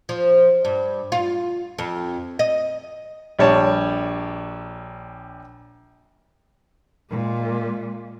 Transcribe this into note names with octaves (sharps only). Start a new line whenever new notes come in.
F3
G2
F4
F2
D#5
A#1 G3 C#5 A5
A#2 G#3